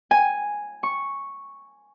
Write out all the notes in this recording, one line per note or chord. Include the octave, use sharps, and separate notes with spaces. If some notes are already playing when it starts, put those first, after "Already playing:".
G#5
C#6